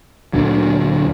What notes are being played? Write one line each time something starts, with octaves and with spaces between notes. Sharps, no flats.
D2 A#2 D3 F#3